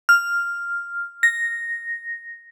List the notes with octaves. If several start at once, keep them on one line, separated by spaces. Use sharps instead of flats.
F6
A#6